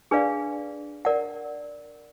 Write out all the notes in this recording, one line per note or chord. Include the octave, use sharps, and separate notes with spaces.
D4 G#4 B4 D5 F5
A#4 D5 F#5